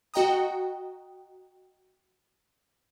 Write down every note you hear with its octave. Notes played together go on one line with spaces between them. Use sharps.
F#4 D#5 G5 A#5 D#6